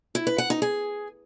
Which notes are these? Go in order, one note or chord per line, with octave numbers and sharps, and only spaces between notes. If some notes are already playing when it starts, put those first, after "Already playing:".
E4
B4
F#5
D#4
G#4